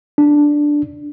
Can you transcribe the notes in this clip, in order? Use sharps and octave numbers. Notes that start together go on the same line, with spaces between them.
D4